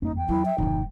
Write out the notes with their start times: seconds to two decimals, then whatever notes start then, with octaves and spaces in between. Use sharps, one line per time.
0.02 G1 F2 A#3 C#4 D#4
0.17 E2 G5
0.29 F#3 E4
0.45 E5
0.58 D#1 F#2 A2 C#3 E3 D#4